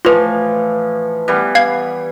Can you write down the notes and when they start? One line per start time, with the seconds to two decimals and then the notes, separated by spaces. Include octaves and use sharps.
0.05 A2 E3 F3 F4 B4
1.28 E3 G3 B3
1.55 F5 G#6